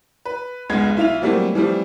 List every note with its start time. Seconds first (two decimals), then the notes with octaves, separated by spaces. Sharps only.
0.25 B4
0.70 F1 C#2 G#3 B3 F4 G#6
0.97 B1 E4 F4 E5 F7
1.22 E3 F#3 G3 A3 A#3 C4
1.55 E3 F3 G3 A3 C4